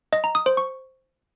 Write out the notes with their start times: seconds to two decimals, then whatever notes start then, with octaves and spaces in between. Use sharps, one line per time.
0.13 D#5
0.24 A#5
0.35 D#6
0.46 C5
0.57 C#6